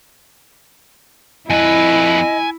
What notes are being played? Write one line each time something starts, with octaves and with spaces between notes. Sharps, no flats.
F2 E4 B4 D#5 G#5